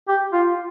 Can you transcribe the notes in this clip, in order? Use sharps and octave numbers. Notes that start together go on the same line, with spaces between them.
G4
F4